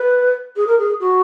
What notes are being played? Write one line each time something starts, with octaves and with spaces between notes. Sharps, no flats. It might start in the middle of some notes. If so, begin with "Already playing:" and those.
Already playing: B4
G#4
A#4
G#4
F#4